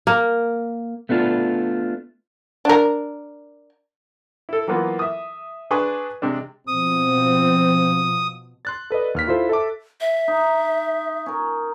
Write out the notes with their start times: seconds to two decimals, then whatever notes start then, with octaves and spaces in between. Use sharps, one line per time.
0.07 A#3
1.09 A3 B3 D4 F4
2.65 D4 A#4
4.49 E4 A4
4.67 E3 F#3 A#3 B3 F4
4.99 E5 D#6
5.71 D4 G#4 B4 G#5 C6 C#6
6.22 C3 G#3 D4
6.67 B2 F3 C4 D#6
8.65 C6 F#6 A6
8.90 A4 B4 D5 D#5
9.15 D#2 F6 B6
9.27 E4 F4 A4 C5
9.49 A4 E5 A5 D6
10.01 E5
10.28 D#4
11.26 C#4 A#4